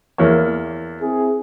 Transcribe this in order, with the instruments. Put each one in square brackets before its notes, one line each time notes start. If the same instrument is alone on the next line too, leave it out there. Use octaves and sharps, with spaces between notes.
[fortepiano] E2 A#3 C#5
[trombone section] C4 E4 G#4